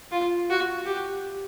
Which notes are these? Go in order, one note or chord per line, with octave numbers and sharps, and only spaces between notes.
F4
F#4
G4